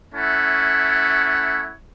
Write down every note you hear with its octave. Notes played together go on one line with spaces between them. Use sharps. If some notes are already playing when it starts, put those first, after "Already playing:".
A3 C#4 E4 C#5 F#5